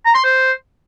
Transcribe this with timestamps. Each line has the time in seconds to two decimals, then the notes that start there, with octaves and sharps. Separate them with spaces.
0.05 A#5
0.15 C6
0.24 C5